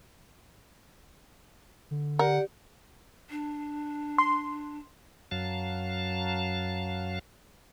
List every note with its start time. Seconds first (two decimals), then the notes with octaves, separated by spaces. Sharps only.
1.91 D3
2.19 G4 A#4 D5 F#5
3.30 D4
4.18 C6
5.31 F#2 F#3 F5 A5